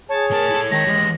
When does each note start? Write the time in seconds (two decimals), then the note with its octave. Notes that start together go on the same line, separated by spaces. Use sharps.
0.09 G#4 C#5 A5
0.31 A2 A#4 A5
0.51 E4 A4
0.71 D#3 G#3 A5 A#6
0.86 E3 G#3 G4